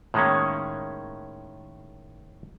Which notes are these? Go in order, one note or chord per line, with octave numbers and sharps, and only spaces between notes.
A2 D#3 G#3 A#3 C#4